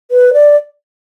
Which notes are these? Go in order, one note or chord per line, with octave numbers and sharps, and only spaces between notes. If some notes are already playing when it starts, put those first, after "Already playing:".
B4
D5